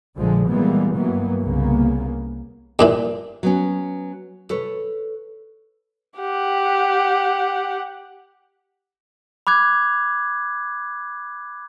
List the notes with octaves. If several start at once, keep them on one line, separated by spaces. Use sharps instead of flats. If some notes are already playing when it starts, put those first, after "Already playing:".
A#1 A#2 D3 F3 G#3
A#2 E3 G3 G#3 A#3 B3
G2 D#3 E3 F#3 A#3 B3
C2 C#3 A#3 B3
G2 A#2 E3
F#3 B3 C#4
A4 B4 C#5
G4 F#5
B5 D6 F#6 G#6